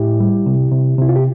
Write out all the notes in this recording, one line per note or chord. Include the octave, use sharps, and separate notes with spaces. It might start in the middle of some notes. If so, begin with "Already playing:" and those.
Already playing: A2 E4 G4
G3
C3
C3
C3 E4
F4
G4